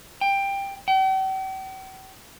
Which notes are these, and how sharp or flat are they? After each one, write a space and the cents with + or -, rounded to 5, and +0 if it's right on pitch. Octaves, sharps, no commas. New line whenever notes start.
G5 +15
G5 -45